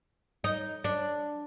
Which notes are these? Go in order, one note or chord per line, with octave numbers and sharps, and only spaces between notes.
D#4
D4